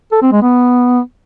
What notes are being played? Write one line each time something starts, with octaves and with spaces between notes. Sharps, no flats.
A4
C4
G#3
B3